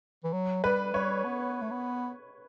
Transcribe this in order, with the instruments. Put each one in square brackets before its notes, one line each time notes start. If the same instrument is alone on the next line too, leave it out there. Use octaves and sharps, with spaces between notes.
[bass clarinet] E3
F#3
[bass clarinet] G3 [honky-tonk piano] B4
[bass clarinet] G3 [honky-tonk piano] C#5
[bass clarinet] B3
A3
B3